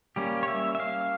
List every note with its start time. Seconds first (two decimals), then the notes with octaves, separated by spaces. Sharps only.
0.16 G3 A#3 C#4 G4
0.43 C#5
0.48 E5
0.75 E5
0.80 F5